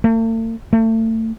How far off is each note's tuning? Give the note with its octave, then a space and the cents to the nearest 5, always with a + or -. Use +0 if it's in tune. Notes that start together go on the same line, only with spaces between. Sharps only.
A3 +45
A3 +30